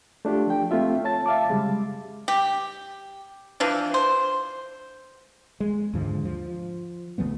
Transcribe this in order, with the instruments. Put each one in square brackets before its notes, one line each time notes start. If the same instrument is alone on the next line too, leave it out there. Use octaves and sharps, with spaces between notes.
[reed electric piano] A3 D4 F4 G4
F3 G5
A3 C4 F4 E5
C#5 A5 A6
E5 F5 A5 D6
C#3 G3 G#3
[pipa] G4
E3 F3 D4
C5
[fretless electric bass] G#3
D#2 G#2 D3 F3
F3
C#2 F3 A3 B3